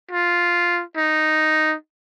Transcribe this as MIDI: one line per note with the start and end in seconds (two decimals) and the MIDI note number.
0.11 0.82 65
0.97 1.75 63